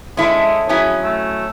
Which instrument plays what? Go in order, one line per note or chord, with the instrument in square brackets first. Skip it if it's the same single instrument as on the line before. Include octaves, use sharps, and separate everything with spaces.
[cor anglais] G#3 [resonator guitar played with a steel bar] C#4 E4 A4
[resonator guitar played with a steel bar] F#3 C#4 E4 [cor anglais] G#4
[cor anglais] A3